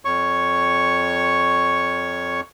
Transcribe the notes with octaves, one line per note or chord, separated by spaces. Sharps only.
F2 C#5 C#6